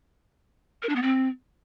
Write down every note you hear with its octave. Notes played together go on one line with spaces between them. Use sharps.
A#4
D4
B3
C4